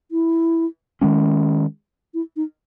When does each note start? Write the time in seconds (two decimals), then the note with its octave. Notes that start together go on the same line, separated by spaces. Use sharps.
0.11 E4
1.01 D#3 G#3 C#4
2.14 E4
2.36 D#4